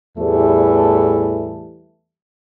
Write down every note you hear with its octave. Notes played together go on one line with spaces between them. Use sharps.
E2 A2 E3 G3 A3